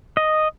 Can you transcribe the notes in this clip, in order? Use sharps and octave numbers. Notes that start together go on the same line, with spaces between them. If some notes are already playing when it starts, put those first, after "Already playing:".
D#5